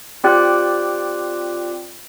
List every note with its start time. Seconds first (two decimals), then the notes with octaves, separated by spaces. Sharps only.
0.24 C4 F4 G4 D5 G5 F#6